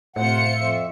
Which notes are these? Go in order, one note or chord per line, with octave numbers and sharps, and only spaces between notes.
A2 C3 F4 C5 F#5 C#7
F2 E5